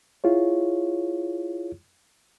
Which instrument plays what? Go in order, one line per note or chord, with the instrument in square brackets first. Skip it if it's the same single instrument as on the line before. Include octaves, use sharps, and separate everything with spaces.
[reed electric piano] E4 F4 G#4 C#5